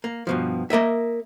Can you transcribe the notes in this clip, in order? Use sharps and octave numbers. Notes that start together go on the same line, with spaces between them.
A#3
G2 B2 F3
A#3 A#4 D#5 E5